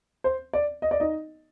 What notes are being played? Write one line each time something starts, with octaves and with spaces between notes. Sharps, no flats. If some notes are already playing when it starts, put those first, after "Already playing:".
C5
D5
D#5
D5
D#4 D#5